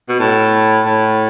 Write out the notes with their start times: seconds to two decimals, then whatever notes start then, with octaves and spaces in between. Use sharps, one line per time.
0.09 B2
0.20 A2
0.86 A2